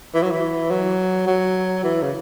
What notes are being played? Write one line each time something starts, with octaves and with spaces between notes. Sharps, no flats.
E3
F#3
E3
F#3
F#3
E3
C#3